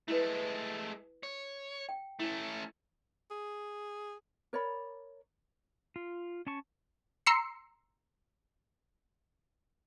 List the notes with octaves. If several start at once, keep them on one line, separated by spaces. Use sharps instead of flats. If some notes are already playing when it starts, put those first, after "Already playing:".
G#3 A3 E4 F#4 B4
C#5
G5
A3 C#4 E4
G#4
A#4 C#5 D5 B5
F4
C#4 A5 C#6
A#5 C6 E6 C7 C#7